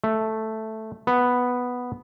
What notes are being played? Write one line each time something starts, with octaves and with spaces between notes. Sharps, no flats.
A3
B3